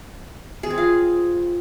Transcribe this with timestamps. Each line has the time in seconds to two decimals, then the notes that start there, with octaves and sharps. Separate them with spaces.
0.63 G#4
0.70 C4
0.78 F4